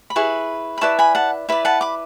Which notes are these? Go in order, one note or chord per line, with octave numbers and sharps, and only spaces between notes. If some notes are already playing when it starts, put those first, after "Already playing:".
B5
E4 G#4 B4 C#6
B5
E4 B4 D5 A5 C#6
G#5 B5
F#5 A5
E4 B4 D5
F#5 A5
B5 D6